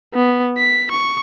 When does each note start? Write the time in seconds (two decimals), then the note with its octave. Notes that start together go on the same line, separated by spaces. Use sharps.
0.14 B3
0.58 B6
0.91 C#6